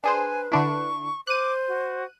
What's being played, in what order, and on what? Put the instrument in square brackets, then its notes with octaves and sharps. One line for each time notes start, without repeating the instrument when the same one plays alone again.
[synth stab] D4 G#4 C5 [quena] B4 [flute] G#5
[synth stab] D3 D4 E4 [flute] C#6
[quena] C5 [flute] D6 [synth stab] F#6 D#7
[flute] F#4